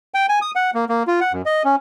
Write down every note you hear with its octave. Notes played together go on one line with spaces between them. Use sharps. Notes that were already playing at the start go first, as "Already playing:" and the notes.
G5
G#5
D#6
F#5
A#3
A#3
F4
F#5
F#2
D#5
C#4